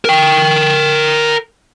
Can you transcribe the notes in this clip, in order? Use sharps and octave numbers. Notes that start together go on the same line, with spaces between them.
A#4 G5